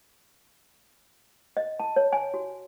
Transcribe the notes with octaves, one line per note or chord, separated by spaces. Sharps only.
D#5
A5
C#5
G#5
F#4